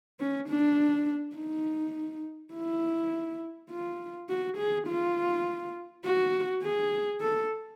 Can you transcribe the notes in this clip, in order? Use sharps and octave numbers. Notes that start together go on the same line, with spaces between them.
C#4
D4
D#4
E4
F4
F#4
G#4
F4
F#4
G#4
A4